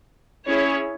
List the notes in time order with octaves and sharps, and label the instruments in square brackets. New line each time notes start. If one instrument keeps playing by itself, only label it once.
[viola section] C#4 E4 G#4 C#5